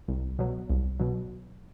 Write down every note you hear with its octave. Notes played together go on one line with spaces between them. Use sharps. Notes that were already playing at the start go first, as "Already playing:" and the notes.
C2
B2 F#3
C2
B2 F#3